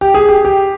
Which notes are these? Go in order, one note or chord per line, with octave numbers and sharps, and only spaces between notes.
G4
G#4
G4
G4